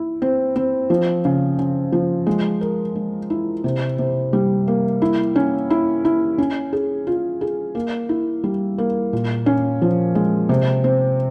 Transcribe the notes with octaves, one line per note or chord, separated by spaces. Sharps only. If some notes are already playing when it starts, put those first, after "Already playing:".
Already playing: E4
C4
C4
F3
C#3
C#3
F3
G#3
A#4
G#3
E4
C3
C3
G3
A#3
E4
C#4
E4
E4
C#4
G#4
F4
G#4
A#3
E4
G3
A#3
A#2
C#4
F3
G#3
C3
C4